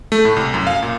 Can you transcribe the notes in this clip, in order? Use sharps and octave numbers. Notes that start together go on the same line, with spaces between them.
A3
A2
C2
F#2
F5
A#2